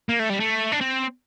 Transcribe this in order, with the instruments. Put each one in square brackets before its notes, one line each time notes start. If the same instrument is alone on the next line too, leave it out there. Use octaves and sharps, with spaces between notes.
[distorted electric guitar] A#3
A3
G3
A3
D4
C4